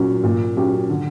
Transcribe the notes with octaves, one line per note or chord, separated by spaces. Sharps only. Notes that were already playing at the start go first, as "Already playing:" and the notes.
Already playing: A#2 F#3 C#4
A#2
F#3 C#4 G4
D3